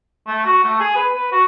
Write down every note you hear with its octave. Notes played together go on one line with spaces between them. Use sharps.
A3
F#4
A3
G#4
B4
B4
F#4